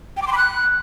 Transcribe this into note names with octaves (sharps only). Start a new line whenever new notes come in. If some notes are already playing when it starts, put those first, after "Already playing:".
G5
D6
C6
B5
F#6